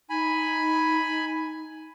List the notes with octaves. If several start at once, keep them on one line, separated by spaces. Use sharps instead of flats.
D#4 G#5 B5